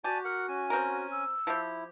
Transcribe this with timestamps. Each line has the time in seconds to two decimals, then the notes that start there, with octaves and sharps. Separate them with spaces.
0.04 F#4 G4 D5 G#5 A5
0.25 A#4 F#5
0.48 C#4 G#5
0.70 C4 A#4
1.11 E6
1.47 F3 E4 G4